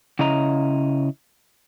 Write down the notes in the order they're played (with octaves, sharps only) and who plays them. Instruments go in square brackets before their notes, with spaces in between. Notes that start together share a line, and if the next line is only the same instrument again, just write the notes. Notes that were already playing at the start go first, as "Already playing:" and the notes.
[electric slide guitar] C#3 E4 D#5 A#5